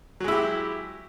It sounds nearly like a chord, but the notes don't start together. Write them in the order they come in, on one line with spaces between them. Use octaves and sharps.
F#3 G#3 E4 G4